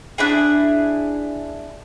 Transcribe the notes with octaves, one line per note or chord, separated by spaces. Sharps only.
D4 E4 G#4